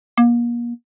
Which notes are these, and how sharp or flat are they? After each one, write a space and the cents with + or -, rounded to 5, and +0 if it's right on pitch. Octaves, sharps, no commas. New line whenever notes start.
A#3 +35